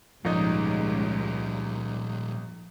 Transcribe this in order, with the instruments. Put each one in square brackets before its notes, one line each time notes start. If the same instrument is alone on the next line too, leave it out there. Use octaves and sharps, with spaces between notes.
[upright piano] G#1 D#4 [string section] C#2 [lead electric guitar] A#2 G3 [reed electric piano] F3